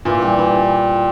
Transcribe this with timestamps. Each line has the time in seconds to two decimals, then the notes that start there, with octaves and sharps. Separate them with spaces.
0.05 A#2 E3
0.22 G3
0.39 E3